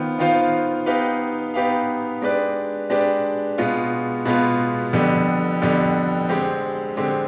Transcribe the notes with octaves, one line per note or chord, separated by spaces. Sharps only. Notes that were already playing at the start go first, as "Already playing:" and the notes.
Already playing: D#3 B3 F4 C5 F5
D#3 B3 F4 C5 F5
B3 D#4 G4 B4 F5
B3 D#4 G4 B4 F5
G#3 D4 G4 B4 D5
G#3 D4 G4 B4 D5
B2 G#3 B3 F4
B2 G#3 B3 F4
F2 D3 G3 B3
F2 D3 G3 B3
D3 G#3 C4 G4
D3 G#3 C4 G4